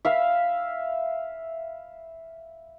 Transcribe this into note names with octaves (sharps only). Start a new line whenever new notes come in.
E5 F5 B5